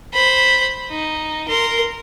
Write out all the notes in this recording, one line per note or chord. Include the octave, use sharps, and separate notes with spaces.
C5 B5
D#4
A#4 C6